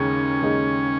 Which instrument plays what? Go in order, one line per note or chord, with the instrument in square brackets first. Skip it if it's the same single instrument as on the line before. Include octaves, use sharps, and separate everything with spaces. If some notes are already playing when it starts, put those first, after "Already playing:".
Already playing: [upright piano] D#2 C#3 G#3 D#4 [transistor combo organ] C#4
[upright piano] D#2 C#3 G#3 D#4